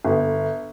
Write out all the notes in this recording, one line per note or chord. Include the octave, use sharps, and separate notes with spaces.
G1